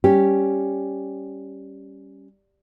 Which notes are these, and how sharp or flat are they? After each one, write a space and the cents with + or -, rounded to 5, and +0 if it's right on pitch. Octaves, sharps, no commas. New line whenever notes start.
G3 +0 C#4 -5 G4 +0